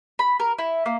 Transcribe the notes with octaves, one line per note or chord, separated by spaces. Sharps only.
B5
A#4
E4
A#3